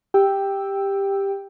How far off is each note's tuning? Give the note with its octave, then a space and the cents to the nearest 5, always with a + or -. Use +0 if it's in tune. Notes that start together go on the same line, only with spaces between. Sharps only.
G4 +10 G5 +0 E6 -5